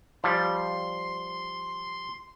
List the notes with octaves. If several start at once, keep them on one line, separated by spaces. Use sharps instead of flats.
F3 G3 C6